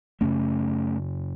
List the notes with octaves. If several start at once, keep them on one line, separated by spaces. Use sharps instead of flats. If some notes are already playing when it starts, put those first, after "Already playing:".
F#2 C#3 A3 C#4